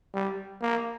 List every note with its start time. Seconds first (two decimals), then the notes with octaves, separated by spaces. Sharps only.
0.14 G3
0.62 A#3